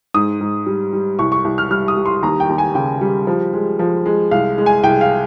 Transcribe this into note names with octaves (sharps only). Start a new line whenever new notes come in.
G#2 D#6
G#2
G3
G3
C2 C#6
C#6
C2
F6
G3 F6
D#6
G3
C6
D#2 A#5
G5
D#2
G#5
C#3 G5
G3
F3
G#3
F3
G#3
C2 F5
G#3
G#5
C2 G5
F5